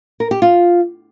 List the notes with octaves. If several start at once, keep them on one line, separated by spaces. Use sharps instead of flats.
A#4
G4
F4